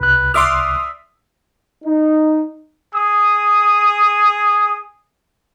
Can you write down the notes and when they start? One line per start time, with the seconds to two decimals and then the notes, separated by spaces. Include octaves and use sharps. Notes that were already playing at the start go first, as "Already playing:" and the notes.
0.01 C2 B4 F#6
0.34 D5 E5 C6 D6 D#6 F6
1.85 D#4
2.94 G#4 D#6